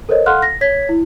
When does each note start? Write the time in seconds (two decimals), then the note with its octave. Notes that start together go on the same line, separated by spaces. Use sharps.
0.09 A4 A#4 C5 C#5 D#5
0.26 A4 F5 F#5 C6 F6 F#6
0.42 A#6
0.61 C#5 G#6 B6
0.89 E4